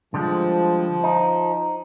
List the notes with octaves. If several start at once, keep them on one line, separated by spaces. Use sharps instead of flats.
D3 F3 G3 G#3
D#4